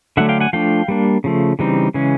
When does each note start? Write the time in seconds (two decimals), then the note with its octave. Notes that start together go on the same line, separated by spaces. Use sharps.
0.17 D3 F#3 A3 D4 E5 F#5
0.29 F5 G5
0.40 F#5 G#5
0.53 F3 A3 D4 F5 G5
0.88 G3 A#3 D4
1.24 C#3 F3 A3
1.59 C#3 E3 G3 C4 D#4
1.94 C#3 E3 G#3 C#4